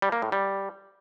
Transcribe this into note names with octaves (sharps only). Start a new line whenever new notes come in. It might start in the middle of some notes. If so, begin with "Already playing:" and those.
G3
A#3
A2
G3